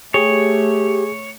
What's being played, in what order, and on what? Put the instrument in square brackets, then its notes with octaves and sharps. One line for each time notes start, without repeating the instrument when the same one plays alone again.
[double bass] A3 [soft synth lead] G4 [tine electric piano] G#4 [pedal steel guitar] C#5